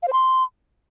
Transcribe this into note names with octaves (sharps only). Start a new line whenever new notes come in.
F5
C5
C6